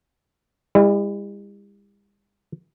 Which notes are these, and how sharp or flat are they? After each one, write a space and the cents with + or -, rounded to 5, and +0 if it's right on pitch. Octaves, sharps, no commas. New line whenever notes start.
G3 +45 E4 +0